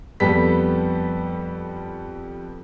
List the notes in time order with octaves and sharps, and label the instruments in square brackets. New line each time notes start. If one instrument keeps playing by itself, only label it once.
[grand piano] F2 G3 B3 A4 B6